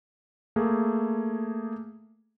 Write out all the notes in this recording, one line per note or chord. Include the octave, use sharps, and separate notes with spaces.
A3 A#3 G#4